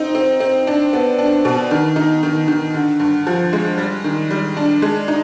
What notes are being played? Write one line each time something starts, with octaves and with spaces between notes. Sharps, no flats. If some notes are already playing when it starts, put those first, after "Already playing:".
Already playing: C4 D#4
C4
C4
D4
B3
D4
B2
D#3
D#4
D#3
D#3
D3
G2
F3
G#3
G3
D#3
G3
D4
G#3
D#4